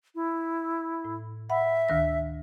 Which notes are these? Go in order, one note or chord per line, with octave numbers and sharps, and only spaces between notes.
E4
A2
E5 F#5 B5
D2 D#3 A#6